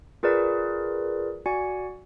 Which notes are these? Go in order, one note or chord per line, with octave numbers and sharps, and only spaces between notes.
F4 G#4 A#4 B4 D5
F#4 D5 G#5 C#7